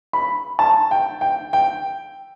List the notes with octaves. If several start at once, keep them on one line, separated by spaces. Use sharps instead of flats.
B5
A5
G5
G5
G5